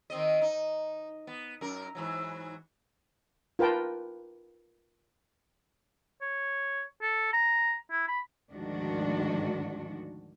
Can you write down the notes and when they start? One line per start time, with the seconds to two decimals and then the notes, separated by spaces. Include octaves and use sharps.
0.10 D#3 C4 D#5
0.42 D#4
1.27 B3
1.61 F#2 A#4
1.95 G#2 E3 F#3
3.59 F4 A#4 B4 G5 A5
6.21 C#5
7.02 A4
7.33 A#5
7.91 E4
8.08 B5
8.53 D2 G#2 D#3 F3 D4 F#4